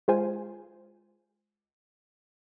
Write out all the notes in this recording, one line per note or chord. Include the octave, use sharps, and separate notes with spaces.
G#3 F4 C5 G#5